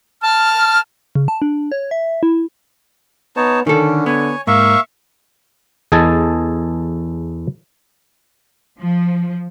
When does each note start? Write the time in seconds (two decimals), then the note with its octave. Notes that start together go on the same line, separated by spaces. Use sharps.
0.23 A5 F6
1.15 C#3
1.28 A5
1.42 D4
1.72 C#5
1.91 E5
2.23 E4
3.36 B3 D#4 C#5 A5
3.67 D3 D#3 C#4 A4
4.06 B3 C#5 G#5
4.47 G#2 A#3 E5 F5 C#6
5.92 E2 G#4 A4 D#5 G#5 A5
8.79 F3